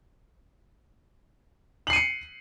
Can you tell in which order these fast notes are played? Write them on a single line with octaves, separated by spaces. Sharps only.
F#7 C7 D#7 C#7